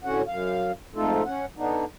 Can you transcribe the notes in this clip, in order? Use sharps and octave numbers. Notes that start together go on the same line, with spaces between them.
A2 D3 C#4 F#4 F#5
F#2 F5
F2 G#2 A3 D#4 F4 A4
C#4 F#5
D3 B3 D4 D#4